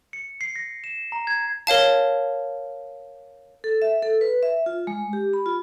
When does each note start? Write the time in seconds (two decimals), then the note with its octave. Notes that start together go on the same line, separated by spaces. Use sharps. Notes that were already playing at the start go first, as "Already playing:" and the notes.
0.13 C#7
0.41 C7
0.56 A#6
0.84 E7
1.12 A#5
1.27 G#6
1.67 A#4 C#5 F5 A5
3.64 A4
3.82 E5
4.02 A4
4.21 B4
4.43 E5
4.66 F4
4.87 G#3
5.13 G4
5.33 B5
5.46 F4